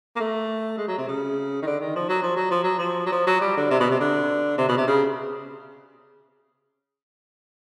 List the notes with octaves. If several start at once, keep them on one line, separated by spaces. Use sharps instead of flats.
A#3
A3
G#3
F#3
C3
C#3
D#3
D3
D#3
F3
F#3
F3
F#3
F3
F#3
F3
F#3
F3
F#3
G3
D3
C3
B2
C3
D3
C3
B2
C3
C#3